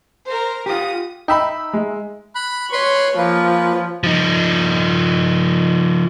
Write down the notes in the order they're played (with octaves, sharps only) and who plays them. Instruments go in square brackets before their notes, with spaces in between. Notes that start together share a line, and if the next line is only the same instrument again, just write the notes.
[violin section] A#4 C5
[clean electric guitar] F4 G4 [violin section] D#6
[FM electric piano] D#4 E5 [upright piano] G5 B5
[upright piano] G#3
[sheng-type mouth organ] B5 F#6
[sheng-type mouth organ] B4 B5 C6 [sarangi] C#5
[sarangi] F3 [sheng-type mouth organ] A#3 B4
[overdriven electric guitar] F3 D#4